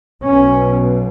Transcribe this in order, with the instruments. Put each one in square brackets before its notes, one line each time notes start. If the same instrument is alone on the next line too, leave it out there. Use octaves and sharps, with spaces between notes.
[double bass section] B1 B2 C#4